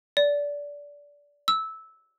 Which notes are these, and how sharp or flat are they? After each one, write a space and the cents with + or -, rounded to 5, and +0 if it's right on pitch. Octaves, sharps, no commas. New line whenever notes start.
D5 -20
E6 -15